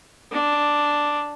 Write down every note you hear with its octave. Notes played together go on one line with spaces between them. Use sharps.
D4